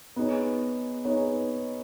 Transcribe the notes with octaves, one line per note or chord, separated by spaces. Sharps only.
B3 D#4 G#4 C#5
B3 D#4 G#4 C#5